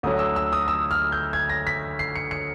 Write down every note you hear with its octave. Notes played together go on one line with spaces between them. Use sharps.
D2 D3 F#3 D#6
E6
E6
D#6
E6
F6
G6
G#6
A#6
B6
C7
C#7
C#7